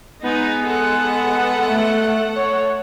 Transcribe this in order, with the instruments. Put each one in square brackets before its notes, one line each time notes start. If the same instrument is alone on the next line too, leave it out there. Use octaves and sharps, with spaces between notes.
[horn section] G#3 B3 [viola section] D#4
[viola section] A4 F#5
[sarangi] A3
C#5